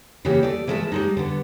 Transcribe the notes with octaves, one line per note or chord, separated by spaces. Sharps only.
C#3 E3 A#3 F#4 G4
A3 D5
E3 F3 G#3 A3 E5 A5
G3 G#3 D#4
D3 B3